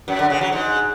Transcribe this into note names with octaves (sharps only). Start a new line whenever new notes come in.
F#2
D3
C#3
F#3
G#2